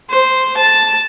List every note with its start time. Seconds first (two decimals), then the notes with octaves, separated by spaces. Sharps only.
0.10 C5
0.57 A5